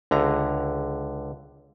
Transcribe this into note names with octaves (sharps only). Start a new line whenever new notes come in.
C#2 D3 A#5